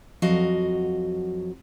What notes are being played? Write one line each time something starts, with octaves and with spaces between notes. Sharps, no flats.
F2 F#3 F#4 D#5 F5